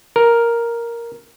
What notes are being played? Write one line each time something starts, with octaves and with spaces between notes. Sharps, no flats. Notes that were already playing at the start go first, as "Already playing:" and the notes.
A#4